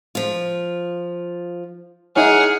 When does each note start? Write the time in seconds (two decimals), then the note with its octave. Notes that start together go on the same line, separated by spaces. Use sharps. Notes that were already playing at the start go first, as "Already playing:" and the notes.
0.15 F3 F4
2.16 D#4 E4 G#4 C#5 F#5 F6